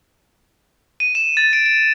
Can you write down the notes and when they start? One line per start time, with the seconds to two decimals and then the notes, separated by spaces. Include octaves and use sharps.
1.00 D#7
1.15 E7
1.37 A6
1.53 D7
1.66 D7